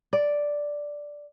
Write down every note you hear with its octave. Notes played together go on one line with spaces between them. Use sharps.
D5